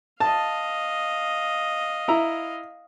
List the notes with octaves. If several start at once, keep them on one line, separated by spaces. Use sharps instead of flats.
D#5 F5 A5
E4 A#5